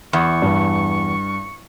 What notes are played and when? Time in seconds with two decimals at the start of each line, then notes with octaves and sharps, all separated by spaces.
0.13 E2 C#6
0.42 G2